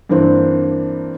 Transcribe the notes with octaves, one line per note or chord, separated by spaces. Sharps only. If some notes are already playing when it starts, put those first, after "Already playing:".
G2 E3 A#3 C4 D4